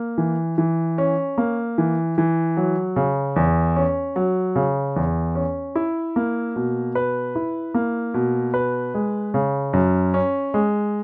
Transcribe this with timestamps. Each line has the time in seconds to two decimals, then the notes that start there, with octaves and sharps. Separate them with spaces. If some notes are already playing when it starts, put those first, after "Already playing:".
Already playing: A#3
0.18 E3
0.58 E3
0.98 C#4
1.38 A#3
1.78 E3
2.18 E3
2.57 F#3
2.96 C#3
3.36 E2
3.76 C#4
4.16 F#3
4.56 C#3
4.96 E2
5.35 C#4
5.75 E4
6.16 A#3
6.56 B2
6.95 B4
7.35 E4
7.74 A#3
8.14 B2
8.54 B4
8.94 G#3
9.34 C#3
9.73 F#2
10.14 C#4
10.54 G#3